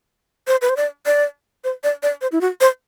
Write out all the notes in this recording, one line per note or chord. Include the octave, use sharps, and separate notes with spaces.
C5
B4
C5
D5
D5
C5
D5
D5
C5
E4
F#4
C5